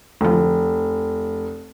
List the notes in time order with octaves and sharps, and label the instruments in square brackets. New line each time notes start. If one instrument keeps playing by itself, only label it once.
[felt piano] F1 [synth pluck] D2 F3